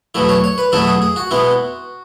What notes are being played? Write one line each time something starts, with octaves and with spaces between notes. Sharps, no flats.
E2 B2 F#3 A3 E4
C#5
C#5
B4
E2 B2 F#3 A3 E4 A4
G#4
G#4
F#4
B2 G#3 B3 E4